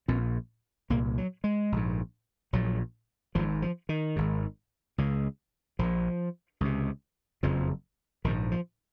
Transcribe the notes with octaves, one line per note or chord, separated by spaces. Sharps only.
A#1 A#2 C4
C2 A#2 A#3
F#3
G#3
A#1 G#2
A#1 A#2 F#3
G#1 G#2 F3
F3
D#3
G#1 G#2
C#2 C#3
A#1 A#2 F3
C#2 C3
F#1 F2 C#3 F3
A#1 G#2 D#3
F3